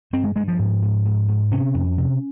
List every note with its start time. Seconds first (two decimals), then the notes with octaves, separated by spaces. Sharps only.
0.13 G2 C4
0.24 G#3
0.36 G2 G#3
0.48 F3
0.59 G#2
0.82 G#2
1.05 G#2
1.28 G#2
1.51 C3 C#4
1.74 F2
1.98 C3